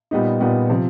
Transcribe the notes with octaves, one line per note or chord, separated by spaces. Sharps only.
A#2 G3 B3 D#4
A#2 G3 B3 D#4
C3 F3